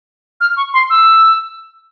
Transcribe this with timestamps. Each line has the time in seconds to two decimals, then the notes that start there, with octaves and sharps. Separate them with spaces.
0.41 F6
0.57 C#6
0.74 C6
0.90 E6